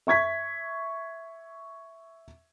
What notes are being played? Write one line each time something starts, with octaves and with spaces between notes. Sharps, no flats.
E5 C#6 G#6 B6